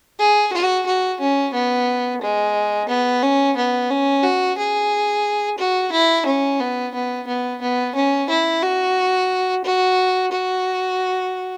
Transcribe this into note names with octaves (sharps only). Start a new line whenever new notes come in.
G#4
F#4
F#4
C#4
B3
G#3
B3
C#4
B3
C#4
F#4
G#4
F#4
E4
C#4
B3
B3
B3
B3
C#4
E4
F#4
F#4
F#4